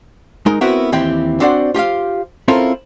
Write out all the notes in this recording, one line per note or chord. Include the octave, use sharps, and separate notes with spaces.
G#3 D#4 A#4
B3 C4 E4 F#4 A#4 B4
D#2 E3 C4 E4 G4 G5
C4 D4 F#4 C5 D5 F#5
F4 G4 C5 F5
C4 C#4 E4 F4 A4 A#4